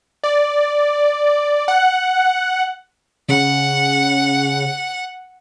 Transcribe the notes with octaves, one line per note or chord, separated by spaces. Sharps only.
D5
F#5
C#3 F#5